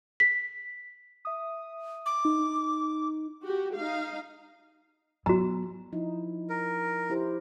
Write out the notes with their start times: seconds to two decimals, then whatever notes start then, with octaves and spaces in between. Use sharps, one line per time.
0.20 B6
1.25 E5 D#6
2.06 D6
2.25 D#4
3.43 F#4 G4
3.75 D#4 F5
5.26 F#3 B3 F#4 A#5
5.92 F3 D#4 E4
6.50 A#4
7.10 E4 G4 C5